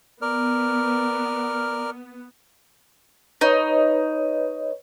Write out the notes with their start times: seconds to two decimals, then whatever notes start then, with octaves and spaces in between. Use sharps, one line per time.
0.22 B3 A#4 D5 F6
3.41 D#4 B4 C#5 D#5